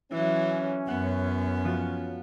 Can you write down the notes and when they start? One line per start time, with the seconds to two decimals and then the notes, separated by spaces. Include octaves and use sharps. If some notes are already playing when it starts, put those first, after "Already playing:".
0.12 E3 F#3 C#4 E4
0.88 F#2 B3 F#5
1.65 F3 F4 F#4